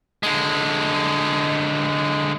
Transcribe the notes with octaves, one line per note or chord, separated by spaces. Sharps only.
D3 G#3